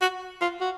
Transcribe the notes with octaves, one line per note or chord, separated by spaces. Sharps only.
F#4
F4
F#4